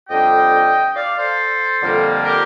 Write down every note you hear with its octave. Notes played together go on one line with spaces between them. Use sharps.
F2 D3 G3 D4 D#5 G5
D5 F5
A4 C5
F2 D3 G3 A#3
G4 A#4